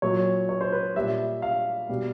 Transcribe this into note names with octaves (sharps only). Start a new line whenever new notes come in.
A#2 F#3 C#5
C#5
C5
B4
A#2 G3 E5
F5
B2 G3